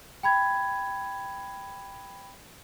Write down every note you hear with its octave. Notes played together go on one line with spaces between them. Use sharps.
G5 B5 G#6